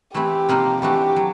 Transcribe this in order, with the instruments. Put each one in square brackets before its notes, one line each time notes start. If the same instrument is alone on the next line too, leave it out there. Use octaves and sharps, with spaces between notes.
[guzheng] E3 A3 C4 E4 [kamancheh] G4
[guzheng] C3 F3 A#3 D#4
[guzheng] E3 A3 D4 F#4 [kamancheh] G4
[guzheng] F#3